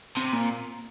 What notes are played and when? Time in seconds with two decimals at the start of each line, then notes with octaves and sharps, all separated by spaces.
0.17 C3
0.32 A#2